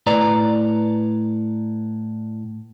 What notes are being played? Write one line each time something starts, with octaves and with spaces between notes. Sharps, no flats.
A2 B4 D5 A#5